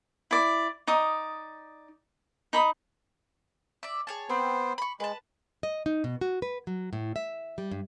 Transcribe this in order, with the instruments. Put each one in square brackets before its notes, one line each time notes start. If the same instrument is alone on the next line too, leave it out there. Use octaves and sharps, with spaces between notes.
[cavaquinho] E4 D5
D#4 D5 D#6
D#4 B5 D#6
[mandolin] D5 E5
G#4 C#5 A5
[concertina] B3 C5 [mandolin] C4
[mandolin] B5 C#6
[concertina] G#3 [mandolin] B4 A5
[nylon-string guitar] D#5
D#4
B2
F#4
B4
F#3
A2
E5
G3
G2